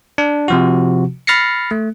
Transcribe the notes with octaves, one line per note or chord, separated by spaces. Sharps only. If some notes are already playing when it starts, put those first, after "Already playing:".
D4
C3 F3 F#4
B5 F6 A6 A#6 C7 C#7
A3